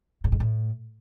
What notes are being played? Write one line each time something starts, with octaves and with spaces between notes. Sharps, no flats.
A2
G#2
A2